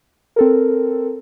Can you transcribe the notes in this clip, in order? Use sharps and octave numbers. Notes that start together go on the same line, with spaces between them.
C4 A4 A#4